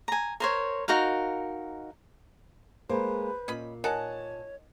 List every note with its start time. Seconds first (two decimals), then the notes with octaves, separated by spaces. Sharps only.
0.08 G#5 A#5
0.40 A#4 C5 C#5
0.88 D#4 F#4 A#4 F5
2.89 G#3 A#3 B4 C5
3.48 A#2 C#4 D#5 B5
3.84 D#4 A#4 C#5 F#5 G#5 A5